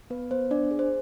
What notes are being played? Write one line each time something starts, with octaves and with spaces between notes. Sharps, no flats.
B3 B4
B3 C5
D4 D5
G#4
C5